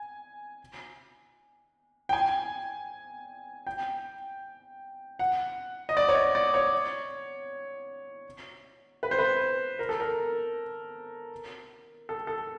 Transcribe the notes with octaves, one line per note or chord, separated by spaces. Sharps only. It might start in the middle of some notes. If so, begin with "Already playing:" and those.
Already playing: G#5
G5
G#5
G5
F#5
D#5
D5
C#5
D5
D5
C#5
B4
C5
B4
A#4
A4
A#4
A4
A4